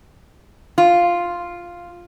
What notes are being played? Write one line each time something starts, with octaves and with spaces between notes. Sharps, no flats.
F4